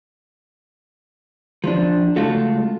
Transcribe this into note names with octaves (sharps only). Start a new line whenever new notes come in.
F3 D4
C#2 G#3 A3 F4 F#4 A4